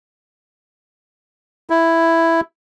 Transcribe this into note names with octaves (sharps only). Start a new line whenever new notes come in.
E4